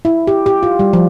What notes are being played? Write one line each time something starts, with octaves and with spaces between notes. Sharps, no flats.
E4
G4
G4
F4
G3
F3